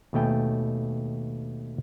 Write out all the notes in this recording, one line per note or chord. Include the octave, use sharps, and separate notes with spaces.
D#2 B2 A3 G5 G#5